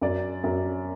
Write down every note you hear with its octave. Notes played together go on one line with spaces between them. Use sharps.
F#2 D5
F#2